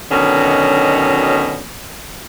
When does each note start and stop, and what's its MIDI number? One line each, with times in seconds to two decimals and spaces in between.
0.11 1.65 47
0.11 1.65 50
0.11 1.65 51
0.11 1.65 54
0.11 1.65 61